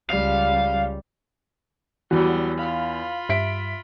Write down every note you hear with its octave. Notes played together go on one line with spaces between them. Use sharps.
C#2 G3 F5
E2 F#3 G3 F#4
F4 F5 B5
G2 E5 B6 D7